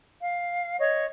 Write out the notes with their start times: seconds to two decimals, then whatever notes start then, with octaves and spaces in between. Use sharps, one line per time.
0.21 F5
0.80 C#5 D#5 C#6